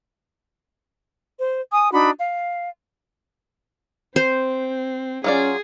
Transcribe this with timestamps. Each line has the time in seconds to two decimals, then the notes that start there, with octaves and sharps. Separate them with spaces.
1.38 C5
1.72 G#5 D#6
1.91 D4 D#4 F#4 B5
2.19 F5
4.16 C4 C5
5.24 F#3 C#4 F4 G#4 D5